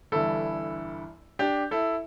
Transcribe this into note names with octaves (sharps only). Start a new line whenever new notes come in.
G1 G2 E3 E4 A4
D4 G4
E4 A4